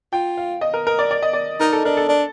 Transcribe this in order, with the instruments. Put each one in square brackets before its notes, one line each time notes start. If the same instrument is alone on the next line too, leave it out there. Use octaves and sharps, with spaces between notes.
[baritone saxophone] F4 [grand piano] G5
[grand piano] F5
D#5
A#4
A#4
D5
D5
D#5
D5
[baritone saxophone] D#4 [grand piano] A#4
[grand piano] A4
[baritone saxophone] D4 [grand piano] A#4
[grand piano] A4
[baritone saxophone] D4